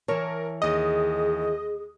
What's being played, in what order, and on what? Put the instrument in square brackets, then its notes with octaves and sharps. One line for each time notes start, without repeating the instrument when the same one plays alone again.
[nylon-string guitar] E3 C#5 [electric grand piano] A#4 A5
[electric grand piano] D#2 D#6 [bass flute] G#4 [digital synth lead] D#5